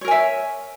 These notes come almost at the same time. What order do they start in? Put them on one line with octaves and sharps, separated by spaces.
C#5 A#4 G#5 E5